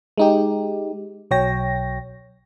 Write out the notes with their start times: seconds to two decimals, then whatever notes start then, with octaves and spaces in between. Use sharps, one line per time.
0.18 G#3 D#4 G4
1.31 B1 F#3 C#5 G5 A#6